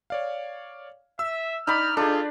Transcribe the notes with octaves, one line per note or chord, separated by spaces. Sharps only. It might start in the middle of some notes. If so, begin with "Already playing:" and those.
C#5 D5 F5
E5 E6
D#4 D5 B5 F6
D4 F4 G#4 A4